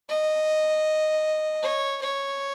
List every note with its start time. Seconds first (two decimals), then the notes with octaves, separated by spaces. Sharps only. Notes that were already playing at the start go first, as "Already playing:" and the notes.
0.09 D#5
1.63 C#5
2.02 C#5